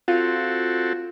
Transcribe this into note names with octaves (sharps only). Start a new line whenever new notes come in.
C4 F4 F#4 A4